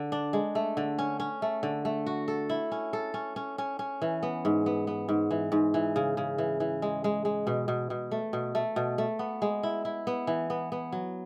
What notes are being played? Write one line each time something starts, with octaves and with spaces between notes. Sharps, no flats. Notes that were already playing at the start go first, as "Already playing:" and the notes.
Already playing: D3
D4
G#3
A3
D3
C#4
C#4
A3
D3
A3
F#4
A4
E4
C#4
A4
C#4
C#4
C#4
C#4
E3
B3
G#2
B3
B3
G#2
E3
G#2
E3
C#3
C#3
E3
E3
G#3
G#3
G#3
B2
B2
B2
A3
B2
A3
B2
A3
B3
G#3
E4
E4
B3
E3
B3
B3
F#3